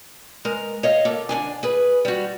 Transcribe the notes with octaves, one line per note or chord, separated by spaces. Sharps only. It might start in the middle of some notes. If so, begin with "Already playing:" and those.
G#3 A#4
C#5 D#5 F5
A#3 A4
D3 D4 G#5
G#4 B4
G3 F#4